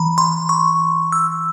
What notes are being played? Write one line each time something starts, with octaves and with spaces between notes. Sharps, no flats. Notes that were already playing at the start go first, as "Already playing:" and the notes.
Already playing: E3 A#5 B5
C6
C#6
E6